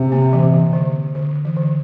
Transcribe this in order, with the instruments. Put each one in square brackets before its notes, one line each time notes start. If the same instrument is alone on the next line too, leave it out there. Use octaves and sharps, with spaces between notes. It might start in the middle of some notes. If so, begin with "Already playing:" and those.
Already playing: [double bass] C3
[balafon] A#3
E3
E3
D3
D3
E3
D3